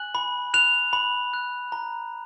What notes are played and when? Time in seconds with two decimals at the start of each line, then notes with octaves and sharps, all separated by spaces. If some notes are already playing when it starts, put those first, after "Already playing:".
Already playing: G#5 F#6 F#7
0.15 B5
0.54 F#6 F7
0.93 B5
1.33 F#6
1.72 A#5